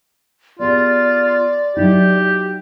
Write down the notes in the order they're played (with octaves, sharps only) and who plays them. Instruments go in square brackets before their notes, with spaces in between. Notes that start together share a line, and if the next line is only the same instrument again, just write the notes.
[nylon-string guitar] B3 G4 G#4 [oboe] F4 [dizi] D5
[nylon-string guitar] F#3 D#4 E4 [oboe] G4